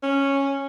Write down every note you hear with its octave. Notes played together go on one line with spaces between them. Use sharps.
C#4